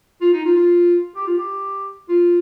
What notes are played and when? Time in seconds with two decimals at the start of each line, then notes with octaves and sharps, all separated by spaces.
0.21 F4
0.33 D#4
0.44 F4
0.56 F4
1.15 G4
1.27 F4
1.37 G4
2.09 F4